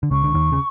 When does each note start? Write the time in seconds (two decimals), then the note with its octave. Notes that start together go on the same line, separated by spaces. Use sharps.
0.03 D3
0.11 C#2 C#3 C#6
0.24 D3
0.34 D#2 D#3
0.52 C#3